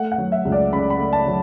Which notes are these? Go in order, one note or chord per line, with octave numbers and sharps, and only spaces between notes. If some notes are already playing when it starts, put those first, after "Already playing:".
Already playing: A3 F#5
F#5
F#3
E5
C#2
D5
C#3 B5
B5
A3
A5
F#3